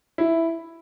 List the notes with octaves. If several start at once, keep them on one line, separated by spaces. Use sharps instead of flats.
E4